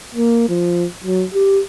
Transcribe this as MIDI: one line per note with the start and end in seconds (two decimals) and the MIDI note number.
0.15 0.47 58
0.49 0.84 53
1.04 1.25 54
1.34 1.61 67